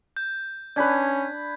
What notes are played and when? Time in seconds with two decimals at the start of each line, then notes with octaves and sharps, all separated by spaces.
0.17 G6
0.76 C#4 D4 B4 G6 G#6 B6